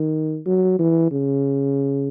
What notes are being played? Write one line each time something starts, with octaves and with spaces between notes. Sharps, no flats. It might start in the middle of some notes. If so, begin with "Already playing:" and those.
Already playing: D#3
F#3
E3
C#3